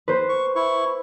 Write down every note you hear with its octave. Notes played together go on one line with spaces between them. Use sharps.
B4 C5
C#6
E4 C#6